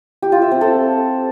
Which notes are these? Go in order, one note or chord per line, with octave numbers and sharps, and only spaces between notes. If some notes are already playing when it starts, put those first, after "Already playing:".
G4
F4
E5
C4
A4